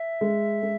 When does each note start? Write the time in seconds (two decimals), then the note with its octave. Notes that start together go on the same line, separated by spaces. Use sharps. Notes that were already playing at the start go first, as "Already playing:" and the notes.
Already playing: E5
0.21 G#3
0.63 G#3